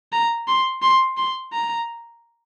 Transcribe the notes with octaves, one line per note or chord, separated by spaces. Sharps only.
A#5
C6
C6
C6
A#5